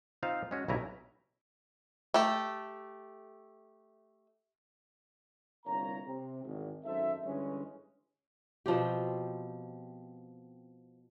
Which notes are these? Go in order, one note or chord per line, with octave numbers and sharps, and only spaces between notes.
C4 D#4 F4 C5 F5
G#3 C#4 F#4
B1 C#3 G3 E4 G#5 A#5
A3 G4
G1 C2 A#3 C#5 A#5
C3 C4
G#1 E2
G#1 F#2 D#4 A4 C5 E5
G2 D3 E3 G#3 C#4
B2 F3 C4 G4